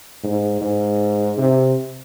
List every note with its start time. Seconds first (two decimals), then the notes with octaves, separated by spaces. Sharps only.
0.23 G#2
0.61 G#2
1.37 C3